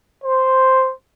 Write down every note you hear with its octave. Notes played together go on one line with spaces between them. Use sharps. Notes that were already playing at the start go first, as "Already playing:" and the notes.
C5